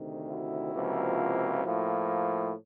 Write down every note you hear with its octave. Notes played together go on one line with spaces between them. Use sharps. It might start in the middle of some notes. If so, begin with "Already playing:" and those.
Already playing: D2 C3 D#3
E4 F#4
C#2 C3 F3 A#3
A2 F3 A#3